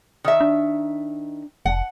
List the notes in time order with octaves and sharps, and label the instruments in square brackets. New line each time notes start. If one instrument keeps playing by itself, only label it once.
[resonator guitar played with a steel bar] D#3 E5
[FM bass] D4
[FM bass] F1 [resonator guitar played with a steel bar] F#5